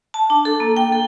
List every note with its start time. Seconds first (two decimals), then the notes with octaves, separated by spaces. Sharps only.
0.14 A5
0.30 D4
0.45 A4
0.60 A#3
0.76 G5
0.92 A4